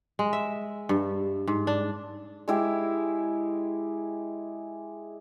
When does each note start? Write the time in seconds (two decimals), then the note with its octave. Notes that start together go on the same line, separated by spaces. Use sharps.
0.19 G#3
0.33 E5
0.89 G2
1.47 G#2
1.67 D4
2.48 G#3 E4 G4